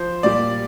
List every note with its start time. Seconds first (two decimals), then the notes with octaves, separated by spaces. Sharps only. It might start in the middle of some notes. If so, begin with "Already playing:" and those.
Already playing: F3 C5
0.23 A#2 G3 D5